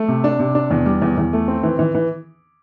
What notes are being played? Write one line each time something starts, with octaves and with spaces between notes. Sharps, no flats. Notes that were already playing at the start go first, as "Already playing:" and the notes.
Already playing: A3
C3
D4
C3
D4
E2
G3
E2
E2
A3
C4
E3
E3
E3